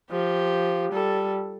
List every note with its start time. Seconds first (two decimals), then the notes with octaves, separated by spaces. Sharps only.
0.11 F3 G4
0.92 G3 A4